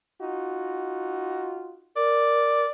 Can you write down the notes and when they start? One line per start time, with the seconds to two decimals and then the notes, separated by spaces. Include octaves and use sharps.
0.20 D#4 F4 F#4
1.96 A#4 D5